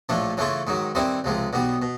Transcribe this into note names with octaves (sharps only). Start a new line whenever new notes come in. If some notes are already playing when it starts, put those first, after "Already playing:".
A#1 A2 F3 A3 D4
C#3 E3 A3 C#4 F4
G#2 D#3 F#3
G2 D#3 G3 C4 E4
C#2 C3 F3 G#3
B1 B2 G3 B3
B2